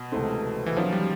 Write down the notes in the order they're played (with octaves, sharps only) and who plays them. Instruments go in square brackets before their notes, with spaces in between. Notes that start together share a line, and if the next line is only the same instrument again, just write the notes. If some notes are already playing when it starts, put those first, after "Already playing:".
Already playing: [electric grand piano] B2
[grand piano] C#2 C3 E3 A3 C4
[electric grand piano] E3
[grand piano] D#3 F#3 A#3 C#4 F4 [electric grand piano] F3
[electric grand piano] G3